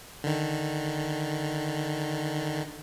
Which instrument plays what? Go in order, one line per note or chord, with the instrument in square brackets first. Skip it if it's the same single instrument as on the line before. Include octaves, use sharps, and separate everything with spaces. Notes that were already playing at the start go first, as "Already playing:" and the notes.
[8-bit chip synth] D3 D#3